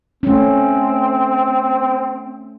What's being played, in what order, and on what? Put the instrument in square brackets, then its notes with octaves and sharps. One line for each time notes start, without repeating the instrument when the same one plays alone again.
[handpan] A3 C#4 [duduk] C4